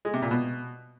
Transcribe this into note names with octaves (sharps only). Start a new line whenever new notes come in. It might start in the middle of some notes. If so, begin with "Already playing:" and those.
G#3
C3
A#2
B2